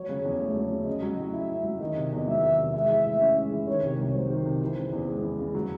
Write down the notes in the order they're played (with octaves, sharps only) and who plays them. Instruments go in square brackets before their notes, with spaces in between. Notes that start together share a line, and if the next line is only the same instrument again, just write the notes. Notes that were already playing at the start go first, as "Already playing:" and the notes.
Already playing: [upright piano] F#3 [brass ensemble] C#5
[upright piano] C#3
E2
A3
F#3
C#3
[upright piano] C#4 [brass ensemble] D#5
[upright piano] F#3
A2
[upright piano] E4 [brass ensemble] E5
[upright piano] C#4
F#3
[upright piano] D#3 [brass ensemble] D#5
[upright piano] C3
E2
[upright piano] F#3 [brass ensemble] E5
[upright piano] D#3
C3
[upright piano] G#3 [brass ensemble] E5
[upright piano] E3
A2
C#4
G#3
E3
[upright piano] D#3 [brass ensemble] C#5
[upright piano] C3
C2
[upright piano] F#3 [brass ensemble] C5
[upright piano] D#3
C3
E3
C#3
E2
G#3
E3
C#3
F#3